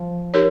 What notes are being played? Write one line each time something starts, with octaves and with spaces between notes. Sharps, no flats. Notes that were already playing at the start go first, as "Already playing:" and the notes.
Already playing: F3
D#4 G4 A#4 C#5